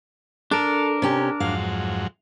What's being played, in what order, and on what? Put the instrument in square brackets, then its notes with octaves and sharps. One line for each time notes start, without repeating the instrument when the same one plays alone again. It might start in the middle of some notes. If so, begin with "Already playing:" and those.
[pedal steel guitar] D4 A#4 [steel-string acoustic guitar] A4
[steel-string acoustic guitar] C3 C#4 G4
[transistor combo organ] F2 G#2 F#3 [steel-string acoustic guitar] F5